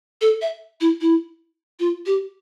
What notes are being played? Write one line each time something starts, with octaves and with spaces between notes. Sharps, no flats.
A4
E5
E4
E4
F4
G4